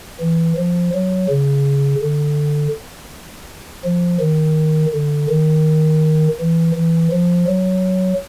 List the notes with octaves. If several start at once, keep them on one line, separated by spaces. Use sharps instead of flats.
E3
F3
F#3
C#3
D3
F3
D#3
D3
D#3
E3
E3
F3
F#3